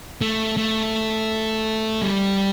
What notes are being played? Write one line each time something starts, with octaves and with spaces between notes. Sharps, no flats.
A3
A3
G3